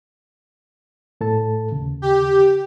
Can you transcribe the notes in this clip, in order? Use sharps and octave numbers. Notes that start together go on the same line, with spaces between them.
A2 A4 A5
D#2 C#3
G4